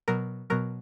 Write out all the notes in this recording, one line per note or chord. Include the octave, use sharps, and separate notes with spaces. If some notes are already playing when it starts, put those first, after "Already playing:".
B2 F#3 A#4
B2 F#3 A#4